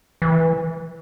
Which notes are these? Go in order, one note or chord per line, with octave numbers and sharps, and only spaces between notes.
E3